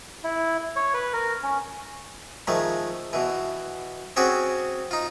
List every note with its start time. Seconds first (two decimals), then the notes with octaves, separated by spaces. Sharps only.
0.24 E4
0.76 C#5
0.94 B4
1.13 A#4
1.43 C#4
2.47 D#3 F3 G#3 A3
3.13 B2 E3
4.16 C4 C#4 F#4 G#4 C5 D5
4.91 D#4 F4